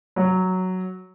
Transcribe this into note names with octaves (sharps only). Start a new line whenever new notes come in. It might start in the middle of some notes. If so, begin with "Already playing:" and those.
F#3